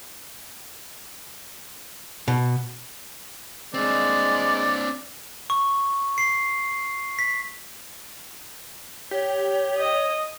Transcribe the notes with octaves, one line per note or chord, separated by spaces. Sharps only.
B2
G#3 C4 D4 D5
C#6
C7
B6
G4 C#5
D#5